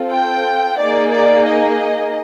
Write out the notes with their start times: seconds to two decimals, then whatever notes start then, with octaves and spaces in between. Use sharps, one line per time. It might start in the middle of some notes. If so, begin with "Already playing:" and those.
Already playing: C4 F4 A4
0.11 G5
0.79 A#3 D#4 G#4 D5
1.12 D5
1.46 D#5